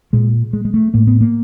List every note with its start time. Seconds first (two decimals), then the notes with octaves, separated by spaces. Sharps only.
0.13 A#2 G#3
0.53 G#3
0.65 G#3
0.74 A3
0.94 A2 A#3
1.07 B3
1.21 A#3